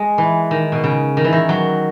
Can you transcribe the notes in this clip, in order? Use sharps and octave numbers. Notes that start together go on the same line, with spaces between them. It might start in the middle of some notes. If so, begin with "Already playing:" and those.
Already playing: G#3
E3
D#3
B2
C#3
D#3
E3
D#3
F#3